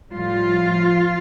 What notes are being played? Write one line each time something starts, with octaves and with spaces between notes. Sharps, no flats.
A2 F3 G3 F4